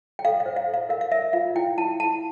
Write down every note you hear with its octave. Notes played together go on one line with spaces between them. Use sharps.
G5
A4 F5
F5
C5
F5
A4
F5
A#4 F5
F5
A#4 E5
F4 F5
E4 G5
E4 A5
E4 A5